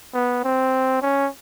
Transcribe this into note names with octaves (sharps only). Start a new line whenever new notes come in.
B3
C4
C#4